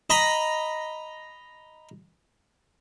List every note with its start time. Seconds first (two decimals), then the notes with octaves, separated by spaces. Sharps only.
0.10 D#5 A#5 B5